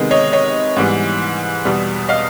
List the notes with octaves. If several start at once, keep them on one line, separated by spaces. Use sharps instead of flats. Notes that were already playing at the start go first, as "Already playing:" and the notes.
Already playing: C3 D#3 G#3 B3
C#5 D#5
C#5 D#5
G#2 E3 G3 B3
E2 B2 G3 B3
D#5 F5